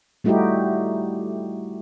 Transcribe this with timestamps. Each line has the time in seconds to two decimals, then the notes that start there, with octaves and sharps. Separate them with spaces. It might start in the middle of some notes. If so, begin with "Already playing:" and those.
0.24 G3 A3 D#4 E4 F#4 G4